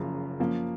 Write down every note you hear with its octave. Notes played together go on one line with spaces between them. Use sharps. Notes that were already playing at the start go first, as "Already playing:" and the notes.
Already playing: F#1 F#2 C#3 F3
F#2 F3 A#3